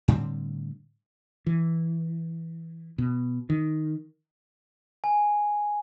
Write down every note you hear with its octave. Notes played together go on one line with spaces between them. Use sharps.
A2 D3 G3 C4
E3
B2
D#3
G#5